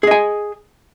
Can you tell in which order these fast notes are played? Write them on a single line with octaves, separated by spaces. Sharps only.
G#4 D#5 G#5